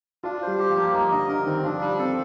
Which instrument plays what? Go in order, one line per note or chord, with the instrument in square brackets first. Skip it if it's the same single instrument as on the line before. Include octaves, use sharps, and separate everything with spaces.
[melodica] D4 [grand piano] F4
[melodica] C5
[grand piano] G3
[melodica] G4
[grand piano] F3
[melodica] A#3
[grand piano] F3 [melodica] D#4
[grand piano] D3 [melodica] D#5
[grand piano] D3 [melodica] A#4
[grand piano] D#3 [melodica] C4
[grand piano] F3 [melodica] D4
[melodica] G3
[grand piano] C4 [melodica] A4